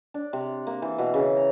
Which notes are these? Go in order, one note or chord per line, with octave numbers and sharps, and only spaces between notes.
D4
C3
A#3
E3
B2
C#3
A#5